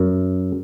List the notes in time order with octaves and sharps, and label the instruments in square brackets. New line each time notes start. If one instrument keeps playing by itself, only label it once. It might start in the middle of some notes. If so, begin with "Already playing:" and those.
Already playing: [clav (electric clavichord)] F#2